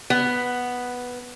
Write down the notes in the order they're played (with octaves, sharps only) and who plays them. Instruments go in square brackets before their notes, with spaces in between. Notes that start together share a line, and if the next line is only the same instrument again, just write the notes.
[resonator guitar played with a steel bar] B3